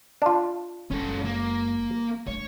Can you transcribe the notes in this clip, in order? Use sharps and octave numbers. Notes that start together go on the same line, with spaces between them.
D4 F4
F#1 G#3 C#4 A4
A#3
A3 D4 C#5